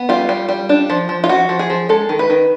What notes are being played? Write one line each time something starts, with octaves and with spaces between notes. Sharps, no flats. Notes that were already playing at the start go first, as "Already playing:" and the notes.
Already playing: B3
G3 F4
G3
G3
D4
F3
F3
F4
F3 F#4
F3
G#4
F3
G#3 A4
D#3
B4
D#3